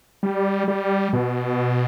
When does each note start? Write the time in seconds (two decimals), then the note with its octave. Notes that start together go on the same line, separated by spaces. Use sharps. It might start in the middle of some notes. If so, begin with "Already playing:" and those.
0.23 G3
0.68 G3
1.13 B2